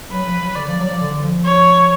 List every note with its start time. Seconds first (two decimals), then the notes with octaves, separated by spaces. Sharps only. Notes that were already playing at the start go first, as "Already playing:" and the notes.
0.12 F#3 B4
0.26 F3
0.41 F#3
0.56 D3 D5
0.67 F3
0.79 F#3
0.90 F3
1.01 D3
1.23 F3
1.45 C#5